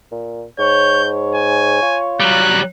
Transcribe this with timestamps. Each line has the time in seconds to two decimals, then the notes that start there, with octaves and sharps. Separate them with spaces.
0.12 A#2
0.59 G#2 C#5 G6
1.04 C#5
1.35 G#5
1.83 F4
2.20 F#3 G3 F#6